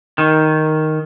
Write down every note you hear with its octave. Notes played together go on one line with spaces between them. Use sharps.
D#3